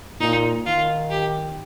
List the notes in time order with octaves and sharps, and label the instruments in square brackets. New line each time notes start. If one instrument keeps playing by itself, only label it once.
[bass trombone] A#2 [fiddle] D#4
[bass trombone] D#3 [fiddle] F4
[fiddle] G4